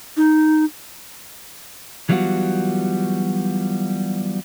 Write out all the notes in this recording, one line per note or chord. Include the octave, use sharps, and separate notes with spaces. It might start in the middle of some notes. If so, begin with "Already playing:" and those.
D#4
E3 F#3 G3 B3 F4 F#4